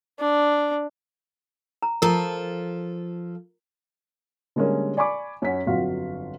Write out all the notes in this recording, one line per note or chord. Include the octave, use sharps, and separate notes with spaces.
D4
A#5
F3 A4 A#4 A#5
D3 G3 G#3 A#3 C#4
D5 G#5 B5 C#6 D6
F#2 C#4 C#5 F#5 B6
G1 F2 F#3 F4 F#4 F5